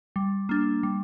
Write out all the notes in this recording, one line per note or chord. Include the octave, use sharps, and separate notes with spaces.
G3
A#3 D4
G3